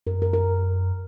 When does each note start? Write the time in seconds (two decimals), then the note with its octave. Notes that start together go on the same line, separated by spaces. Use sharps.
0.06 F#2 A#4
0.22 A#4
0.33 A#4